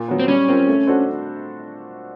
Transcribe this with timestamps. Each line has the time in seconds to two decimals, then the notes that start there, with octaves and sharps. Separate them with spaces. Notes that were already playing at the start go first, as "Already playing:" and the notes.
Already playing: A#2
0.08 F#3 B3
0.19 C4
0.28 G3 C#4
0.48 C4 F4 A#4
0.68 A3
0.87 D4 F#4 A4 C5